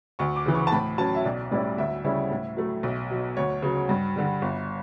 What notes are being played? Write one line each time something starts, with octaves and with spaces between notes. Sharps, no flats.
D2 C#6
D6
C#3 E3
C#6
A5
A2 B5
F#3 C#4 A5
E5
B1 D5
A2 G3 C#4 E4 D5
D2 E5
C#3 G3 C#4 E4
A2
F#3 A3
B1
B2 F#3
D2 C#5
C#3 F#3
G2
D3 G3
G1